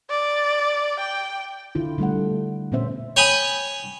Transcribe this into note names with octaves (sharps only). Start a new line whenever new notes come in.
D5
G5
D3 E4 F4
D3 G3 A3 F#5
A#2 B3 C#4 C5 E5
C#5 G5 G#5 B5 D#6